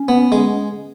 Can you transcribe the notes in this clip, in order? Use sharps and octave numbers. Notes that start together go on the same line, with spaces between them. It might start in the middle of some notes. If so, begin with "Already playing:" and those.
Already playing: C#4
B3
G#3